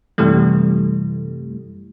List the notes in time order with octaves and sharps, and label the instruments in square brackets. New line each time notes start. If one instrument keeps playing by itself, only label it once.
[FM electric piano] F#2 C3 E3 G3 A3